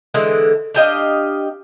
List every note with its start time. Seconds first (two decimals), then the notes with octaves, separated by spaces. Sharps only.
0.14 D3 E3 G#3
0.74 D4 G4 D#5 F5